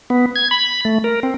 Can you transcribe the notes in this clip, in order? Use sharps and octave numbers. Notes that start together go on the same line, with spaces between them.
B3
G#6
B5
A3
A#4
C4